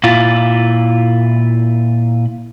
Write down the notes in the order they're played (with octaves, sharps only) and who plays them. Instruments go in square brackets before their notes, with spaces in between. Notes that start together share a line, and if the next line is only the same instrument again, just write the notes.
[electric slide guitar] A#2 E4 F4